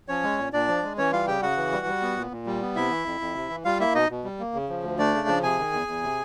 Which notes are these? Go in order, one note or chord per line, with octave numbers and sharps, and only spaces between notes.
F3 C#4 C#5
G#3
A#2
A#2 D4 D5
F3
G#3
E3 C#4 C#5
G3 F4 F5
C#3 G4 G5
C#3 F#4 F#5
E3
G3
G3
B3
A#2
A#2
G3
B3
C3 E4 E5
E3
F2
F2
C3
E3
G3 F4 F5
A#3 E4 E5
B2 D#4 D#5
B2
G3
A#3
C#3
F3
D2
A3 D4 D5
C#3
F3
C3 G#4 G#5
D#3
E2
E2
C3